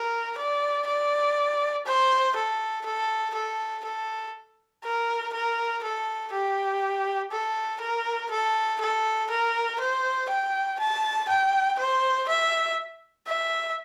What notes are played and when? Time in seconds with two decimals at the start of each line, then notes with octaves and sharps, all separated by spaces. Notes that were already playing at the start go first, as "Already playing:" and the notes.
Already playing: A#4
0.37 D5
0.86 D5
1.85 C5
2.35 A4
2.85 A4
3.34 A4
3.84 A4
4.84 A#4
5.33 A#4
5.83 A4
6.32 G4
7.31 A4
7.81 A#4
8.30 A4
8.80 A4
9.30 A#4
9.80 C5
10.29 G5
10.79 A5
11.28 G5
11.78 C5
12.27 E5
13.26 E5